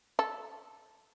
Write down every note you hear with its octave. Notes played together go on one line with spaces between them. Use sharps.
A4